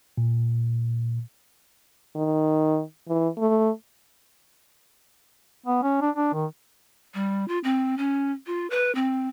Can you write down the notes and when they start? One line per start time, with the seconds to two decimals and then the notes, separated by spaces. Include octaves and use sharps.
0.18 A#2
2.16 D#3
3.08 E3
3.38 A3
5.66 B3
5.83 C#4
6.01 D4
6.16 D4
6.33 D#3
7.14 G3
7.48 F4
7.64 C4
7.98 C#4
8.47 F4
8.70 B4
8.95 C4